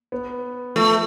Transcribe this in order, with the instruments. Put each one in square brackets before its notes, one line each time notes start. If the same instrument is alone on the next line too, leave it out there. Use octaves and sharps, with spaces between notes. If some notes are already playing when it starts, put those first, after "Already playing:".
[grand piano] B3
[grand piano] F3 [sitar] A3